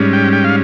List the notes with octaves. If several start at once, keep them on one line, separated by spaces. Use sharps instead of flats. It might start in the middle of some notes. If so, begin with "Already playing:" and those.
Already playing: G#2 G3 C#4
G5
G5
F5